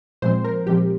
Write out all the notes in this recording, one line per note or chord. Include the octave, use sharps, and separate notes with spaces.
A#2 F3 G#3 C4 C5
A#4
A#2 F3 G#3 C4 G4